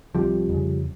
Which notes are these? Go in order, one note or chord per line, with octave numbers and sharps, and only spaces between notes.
C2 C3 F3 G3
F2
C#3